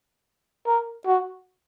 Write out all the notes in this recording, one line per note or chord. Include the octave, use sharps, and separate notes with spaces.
A#4
F#4